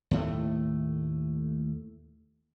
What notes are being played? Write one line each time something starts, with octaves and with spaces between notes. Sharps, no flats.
D#2 A2 A3